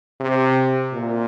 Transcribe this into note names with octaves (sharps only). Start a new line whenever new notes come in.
C3
A#2